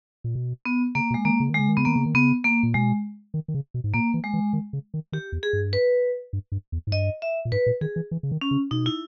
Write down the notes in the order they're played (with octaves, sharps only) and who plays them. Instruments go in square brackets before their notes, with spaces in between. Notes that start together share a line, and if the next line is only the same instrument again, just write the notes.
[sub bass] A#2
B2
[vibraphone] B3
[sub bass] C#3 [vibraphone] A#3
[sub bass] B2
[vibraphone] G#3
[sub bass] D#3 [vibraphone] A#3
[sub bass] C#3
D#3
[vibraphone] G#3
[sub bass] C#3
D#3
[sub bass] C#3 [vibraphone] B3
[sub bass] D#3 [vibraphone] A#3
[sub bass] C#3
D#3
[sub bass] C#3 [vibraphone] B3
[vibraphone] A#3
[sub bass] A#2
[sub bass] B2 [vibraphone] G#3
[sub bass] D#3
D#3
C#3
B2
G#2
[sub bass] A#2 [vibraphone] A#3
[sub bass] E3
[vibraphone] G#3
[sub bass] E3
D#3
C#3
D#3
[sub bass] D#3 [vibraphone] G4
[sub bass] E2
[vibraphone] G#4
[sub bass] G2
[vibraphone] B4
[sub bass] G2
G2
E2
G#2
[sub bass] G2 [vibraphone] D#5
[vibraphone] E5
[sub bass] A#2
[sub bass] G#2 [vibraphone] B4
[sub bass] A#2
[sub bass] D#3 [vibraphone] G#4
[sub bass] E3
E3
C#3
D#3
[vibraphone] C#4
[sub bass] C#3
[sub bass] B2 [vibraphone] D#4
[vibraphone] E4